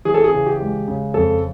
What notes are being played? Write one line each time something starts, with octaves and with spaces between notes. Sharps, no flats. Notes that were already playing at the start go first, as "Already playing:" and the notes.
E3 G#4
A4
G#4
C#3
G4
G#3
C#3
F2 A4